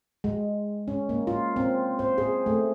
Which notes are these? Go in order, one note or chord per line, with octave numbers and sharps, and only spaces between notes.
G#3
C#4
A#3
F4
C4
C5
G#4
A3